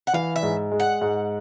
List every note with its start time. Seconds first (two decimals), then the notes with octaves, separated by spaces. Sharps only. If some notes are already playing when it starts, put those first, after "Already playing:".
0.07 F#5
0.13 E3 F5
0.36 E5
0.43 G#2
0.72 G#3
0.80 F#5
1.01 G#2